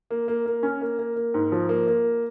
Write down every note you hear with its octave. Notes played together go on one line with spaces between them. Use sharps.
A#3
A#3
A#3
C#4
A#3
A#3
A#3
G#2
F3
A#3
A#3